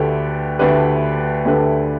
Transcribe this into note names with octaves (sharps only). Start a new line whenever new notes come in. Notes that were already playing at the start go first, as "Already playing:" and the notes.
Already playing: D2 D3 A3 G4 B4
D2 D3 A3 G4 B4
D2 D3 A3 G4 B4